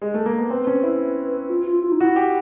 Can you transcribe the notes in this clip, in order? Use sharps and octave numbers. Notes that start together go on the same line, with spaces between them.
G#3
A3
A#3
B3
C4 B4
C#4
E4
F4
F4
F4
D#4
E4 F#4
G4